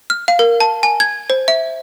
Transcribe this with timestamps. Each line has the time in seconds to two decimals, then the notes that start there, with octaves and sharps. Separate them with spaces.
0.10 F6
0.28 F5
0.39 A#4
0.60 A5
0.83 G#5
1.00 G#6
1.30 C5
1.48 E5